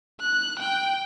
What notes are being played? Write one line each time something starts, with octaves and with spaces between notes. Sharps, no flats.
F#6
G5